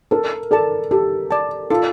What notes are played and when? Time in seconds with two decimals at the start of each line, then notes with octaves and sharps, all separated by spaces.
0.11 A4 A#4
0.51 A4 D5 A5
0.91 G4 A4
1.31 D5 A5
1.70 F4 A4